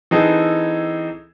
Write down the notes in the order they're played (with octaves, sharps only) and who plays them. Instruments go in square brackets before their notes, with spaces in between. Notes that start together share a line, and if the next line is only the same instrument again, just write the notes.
[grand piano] E3 C4 D#4 G#4 A4